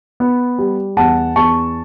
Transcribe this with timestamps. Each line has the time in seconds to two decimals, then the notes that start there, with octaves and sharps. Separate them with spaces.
0.20 B3
0.58 G3
0.97 E2 F#5 A5
1.36 E2 A5 C#6